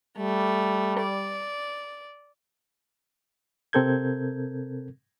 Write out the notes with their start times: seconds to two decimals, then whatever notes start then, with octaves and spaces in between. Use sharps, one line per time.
0.18 G3 A3
0.99 D5
3.73 C3 C4 A4 A#4 G6 G#6